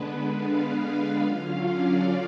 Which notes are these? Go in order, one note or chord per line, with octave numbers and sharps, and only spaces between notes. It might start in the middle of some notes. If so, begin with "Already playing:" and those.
Already playing: D3 G#3 B3 D4 B4
F5
D3 F#3 C#4 F4 F5
D5